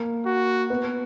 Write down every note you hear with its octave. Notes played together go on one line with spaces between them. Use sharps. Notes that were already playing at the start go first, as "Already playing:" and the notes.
Already playing: A#3
F#4
B3